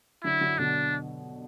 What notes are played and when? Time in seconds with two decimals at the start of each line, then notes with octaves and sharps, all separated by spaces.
0.23 D3 F#3 E4
0.41 D3 F#3
0.58 B2 D3 D4